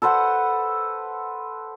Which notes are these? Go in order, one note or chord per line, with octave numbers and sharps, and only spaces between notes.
A4 B4 C5 F#5